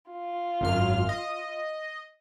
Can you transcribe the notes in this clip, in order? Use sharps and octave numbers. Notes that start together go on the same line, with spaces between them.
F4
G#1 F#2 F6
D#5